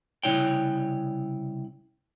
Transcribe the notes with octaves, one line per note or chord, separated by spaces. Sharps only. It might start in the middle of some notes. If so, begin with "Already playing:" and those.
C2 C#3 E3 E4 C#5 G5